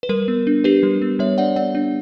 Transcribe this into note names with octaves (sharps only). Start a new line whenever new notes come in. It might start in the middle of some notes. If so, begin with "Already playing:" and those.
B4
G3 A#4
B3
D4
D4 G4 B4
G3
B3
G3 C#5 E5
D4 D5 F#5
B3 D5 F#5
D4